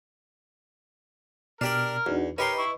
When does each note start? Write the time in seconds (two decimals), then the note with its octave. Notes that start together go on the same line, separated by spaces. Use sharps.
1.61 B2 D4 G4 A#4 D5 F6
2.06 E2 D4 D#4 F#4
2.38 D#4 G4 A#4 B4 C#5 D#5 B5 C6
2.58 E4 C#6